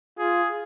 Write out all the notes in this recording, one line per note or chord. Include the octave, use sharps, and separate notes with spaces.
F4 G#4